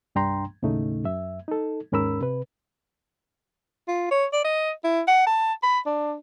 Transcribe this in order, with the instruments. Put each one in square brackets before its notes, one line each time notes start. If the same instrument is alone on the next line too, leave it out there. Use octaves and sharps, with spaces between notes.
[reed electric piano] C2 G2 D4 G5 A#5 C6
D#2 A2 C#3 A3 D#4
F#2 E5
D#4 A4
D#2 G#2 C#4 A#4 B5 E6
C3 B4
[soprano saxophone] F4
C#5
D5
D#5
E4
F#5
A5
B5
D4